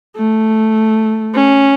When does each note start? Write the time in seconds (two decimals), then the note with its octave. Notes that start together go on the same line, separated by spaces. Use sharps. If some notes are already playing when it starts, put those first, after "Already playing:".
0.17 A3
1.35 C#4